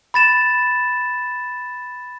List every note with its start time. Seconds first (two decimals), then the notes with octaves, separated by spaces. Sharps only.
0.14 B5 A6 E7